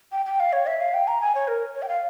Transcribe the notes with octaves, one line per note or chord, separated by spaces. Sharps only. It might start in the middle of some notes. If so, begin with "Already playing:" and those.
G5
G5
F5
C#5
E5
F5
G5
A#5
G#5
C#5
A#4
C#5
G5
F5